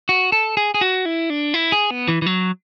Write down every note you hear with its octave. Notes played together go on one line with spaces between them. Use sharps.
F#4
A4
G#4
G#4
F#4
E4
D4
E4
G#4
B3
E3
E3
F#3